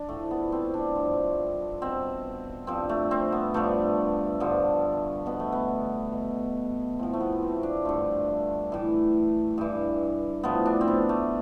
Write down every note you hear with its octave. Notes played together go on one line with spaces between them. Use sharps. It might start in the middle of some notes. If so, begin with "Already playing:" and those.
Already playing: D4
A2 F3 A3
B3
C4
D4
G2 F3
B2 C4
G2 F3 C4
A3
C4
B3
G2 F3 A3
G2 D3 F3
B2 B3
A3
B3
B2
A2 F3 C4
A3
B3
C4
D4
G2 D3 F3 A3
A2 E3
G2 E3
A2 F3 B3
D4
C4
B3
A3